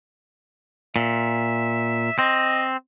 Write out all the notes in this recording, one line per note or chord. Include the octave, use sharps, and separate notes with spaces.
A#2 E5
C4 D#5